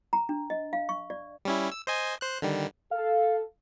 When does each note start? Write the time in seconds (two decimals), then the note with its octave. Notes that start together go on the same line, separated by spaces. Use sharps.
0.13 A#5
0.29 D4
0.50 D#5
0.73 F5
0.89 C#6
1.10 D5
1.45 G3 C#4 E4
1.72 E6
1.87 C5 D#5 G#5
2.21 C5 F#6
2.42 D3 D#3 G3
2.91 A4 F5